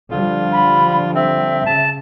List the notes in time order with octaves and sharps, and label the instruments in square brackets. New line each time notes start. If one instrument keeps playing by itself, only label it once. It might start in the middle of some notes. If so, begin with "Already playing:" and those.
[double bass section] D3 F3 G3 [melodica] F4
[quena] B5
[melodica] C4 [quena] E5
[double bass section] C#3 [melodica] A5